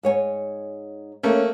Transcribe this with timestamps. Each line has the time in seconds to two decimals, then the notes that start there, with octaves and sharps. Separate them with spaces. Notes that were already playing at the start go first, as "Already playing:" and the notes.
0.03 G#2 C#5 G#5
1.23 A3 A#3 C#4 C#5